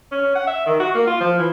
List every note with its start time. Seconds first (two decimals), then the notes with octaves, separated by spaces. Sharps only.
0.12 C#4
0.35 F#5
0.47 E5
0.66 D#3
0.80 F#4
0.95 A#3
1.07 F4
1.20 F3
1.39 E3